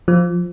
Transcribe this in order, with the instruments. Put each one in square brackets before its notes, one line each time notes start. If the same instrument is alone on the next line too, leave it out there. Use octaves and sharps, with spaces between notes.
[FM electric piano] F3